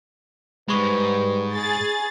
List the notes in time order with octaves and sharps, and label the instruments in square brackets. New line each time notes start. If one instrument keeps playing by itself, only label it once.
[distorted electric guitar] G#2 G#3 [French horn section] G3 B4 [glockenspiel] B5 C#6
[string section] G#4 A6